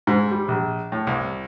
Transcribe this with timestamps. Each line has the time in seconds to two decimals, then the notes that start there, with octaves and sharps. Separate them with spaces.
0.07 G#2
0.31 G3
0.48 A#1
0.92 A2
1.07 C2